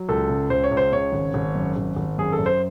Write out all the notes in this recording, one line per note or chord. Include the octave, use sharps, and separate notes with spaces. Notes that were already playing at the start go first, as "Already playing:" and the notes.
Already playing: F#3
C#2 A4
C#3
C#2 C5
C#5
C#2
C5
C#3 C#5
G#1
G#1
F#2
G#1
G#1
F#2 G#4
A4
F#2
C5